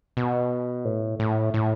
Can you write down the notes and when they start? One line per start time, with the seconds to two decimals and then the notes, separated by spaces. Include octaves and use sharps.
0.17 B2
0.85 A2
1.20 A2
1.54 A2